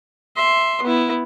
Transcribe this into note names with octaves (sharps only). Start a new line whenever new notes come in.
E5 C6
B3 E4